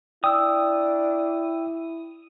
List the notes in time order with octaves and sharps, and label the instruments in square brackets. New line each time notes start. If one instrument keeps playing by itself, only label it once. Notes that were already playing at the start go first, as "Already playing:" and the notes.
[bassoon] D4 [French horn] E4 [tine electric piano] G5 E6 [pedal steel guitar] D#6